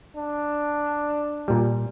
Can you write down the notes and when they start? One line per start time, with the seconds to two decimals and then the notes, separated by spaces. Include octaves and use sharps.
0.17 D4
1.48 A#2 G3